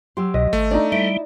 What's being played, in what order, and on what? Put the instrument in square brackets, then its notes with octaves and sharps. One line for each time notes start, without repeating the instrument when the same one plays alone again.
[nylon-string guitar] F#3 G4 [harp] C6 E6
[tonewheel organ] C2 B2 [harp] D#5
[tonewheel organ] G#1 [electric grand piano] A3
[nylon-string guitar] D4 D#5 [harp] D#4 D5
[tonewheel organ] G3 [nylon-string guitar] E4